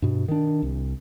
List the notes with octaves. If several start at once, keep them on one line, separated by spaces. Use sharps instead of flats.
G2 B2
D#3 D4
C2